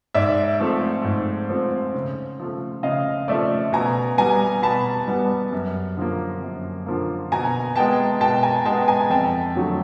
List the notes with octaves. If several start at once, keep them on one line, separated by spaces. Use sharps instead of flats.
G#2 D5 E5
F3 A3 C4
G#2
F3 A3 C4
C#3
F3 A3
C#3 D#5 F5
F3 A3 D5 E5
B2 G#5 A#5
G3 B3 G#5 A#5
B2 A5 B5
G3 B3
F#2
D3 F3 A#3
F#2
D3 F3 A#3
B2 G#5 A#5
G#3 B3 G5 A5
B2 G5 A5
G#5 A#5
G#3 B3 G5 A5
G#5 A#5
F2 G5 A5
D3 F#3 A3